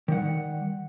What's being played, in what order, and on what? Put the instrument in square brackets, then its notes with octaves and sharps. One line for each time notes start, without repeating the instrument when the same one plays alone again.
[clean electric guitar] D#3 G3 F#5